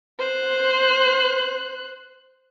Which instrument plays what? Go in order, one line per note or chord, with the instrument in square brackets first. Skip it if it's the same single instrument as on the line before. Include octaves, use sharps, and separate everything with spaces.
[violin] C5 F#6